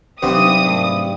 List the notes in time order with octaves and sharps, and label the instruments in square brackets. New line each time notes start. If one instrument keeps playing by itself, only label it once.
[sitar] G2 [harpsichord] C3 B3 C4 [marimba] F#3 D#4 [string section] D#6
[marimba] G#2 A3 A#4